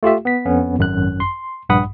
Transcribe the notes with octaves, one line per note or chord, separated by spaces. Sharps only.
A3 F4 G4 E5
B3 B6
F2 B3 C#4
G#1 F#2 F#6
C6
A#1 G2 F#5 B5 D#6